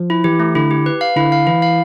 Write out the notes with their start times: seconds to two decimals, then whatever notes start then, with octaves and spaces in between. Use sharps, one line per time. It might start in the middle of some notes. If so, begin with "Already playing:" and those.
Already playing: F3
0.10 E4
0.24 E3 G4
0.40 A3
0.55 D3 E4
0.71 G4
0.86 B4
1.01 F5
1.16 D3 E4
1.32 F5
1.47 E3 E4
1.62 F5